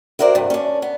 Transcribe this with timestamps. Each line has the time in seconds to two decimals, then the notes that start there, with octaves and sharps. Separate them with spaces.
0.19 E4 F#4 A#4 C5 D5
0.35 G2 C3
0.50 C#4 D4
0.82 B3